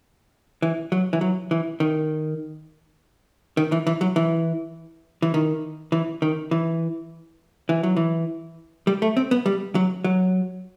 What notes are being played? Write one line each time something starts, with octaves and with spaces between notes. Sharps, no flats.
E3
F#3
E3
F#3
E3
D#3
D#3
E3
E3
F#3
E3
E3
D#3
E3
D#3
E3
E3
F#3
E3
G3
A3
C4
B3
G3
F#3
F#3